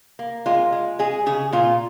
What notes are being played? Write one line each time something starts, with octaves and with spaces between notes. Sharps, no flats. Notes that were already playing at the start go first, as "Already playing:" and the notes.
A#3
G#3 F4
G#3
G#3 G#4
C#3 G#4
A#2 F4